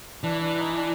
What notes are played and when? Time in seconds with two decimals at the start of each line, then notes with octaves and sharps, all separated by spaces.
0.23 E3 D4
0.42 D4
0.58 D#4
0.76 D4